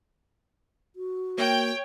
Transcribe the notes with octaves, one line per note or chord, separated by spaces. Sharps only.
F#4
A#3 C#5 G5